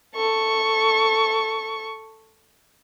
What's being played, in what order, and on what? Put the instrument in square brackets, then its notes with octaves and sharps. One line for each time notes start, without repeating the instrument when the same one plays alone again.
[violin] A4 C#6